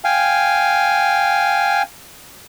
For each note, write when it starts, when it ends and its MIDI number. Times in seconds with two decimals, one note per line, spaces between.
0.04 1.82 77
0.04 1.82 79
0.04 1.82 80